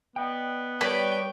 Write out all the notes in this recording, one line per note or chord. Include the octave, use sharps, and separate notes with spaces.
B3 D5 D#5 G5
G3 G4 B4 C#5 D5 G5 A5